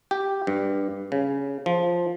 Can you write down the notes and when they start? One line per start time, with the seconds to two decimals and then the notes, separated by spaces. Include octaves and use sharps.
0.11 G4
0.47 G2
1.12 C#3
1.66 F3